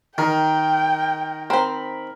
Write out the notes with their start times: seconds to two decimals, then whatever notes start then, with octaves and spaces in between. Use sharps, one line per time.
0.18 D#3 A#4 G5
1.50 C4 A#4 C5 B5